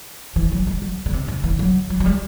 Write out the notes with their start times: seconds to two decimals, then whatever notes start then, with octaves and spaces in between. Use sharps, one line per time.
0.36 E3
0.52 F#3
0.67 G3
0.82 F#3
1.06 D3
1.13 C3
1.28 D3
1.44 E3
1.59 F#3
1.90 F#3
2.00 F#3
2.06 G3